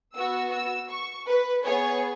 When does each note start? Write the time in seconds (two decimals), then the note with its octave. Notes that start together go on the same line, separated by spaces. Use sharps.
0.15 B3 F#4 E6
0.52 E6
0.90 C#6
1.28 B4
1.65 B3 G#4 C#5